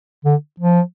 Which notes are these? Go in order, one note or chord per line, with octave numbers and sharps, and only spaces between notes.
D3
F3